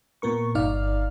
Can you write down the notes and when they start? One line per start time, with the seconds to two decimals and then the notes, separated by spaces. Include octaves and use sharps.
0.22 A#2 B3 A#4 C#6
0.55 G1 D#4 D5 F5 F6